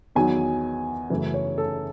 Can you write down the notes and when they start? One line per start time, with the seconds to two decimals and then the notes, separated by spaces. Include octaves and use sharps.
0.15 E2 D#3 F#3 G#5
1.10 F#2 C#3 E3 A3
1.34 C#5
1.58 A4